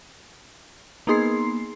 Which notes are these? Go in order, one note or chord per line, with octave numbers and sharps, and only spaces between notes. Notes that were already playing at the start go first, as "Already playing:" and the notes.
A#3 B3 D#4 G#4 C6 C7